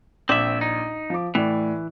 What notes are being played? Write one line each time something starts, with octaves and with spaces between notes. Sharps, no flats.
A#1 C4 E5 D6 F#7
D#4
F3 D6
A2 E3 D5